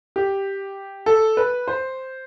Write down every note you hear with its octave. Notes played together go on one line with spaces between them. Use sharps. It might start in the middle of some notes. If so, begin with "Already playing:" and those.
G4
A4
B4
C5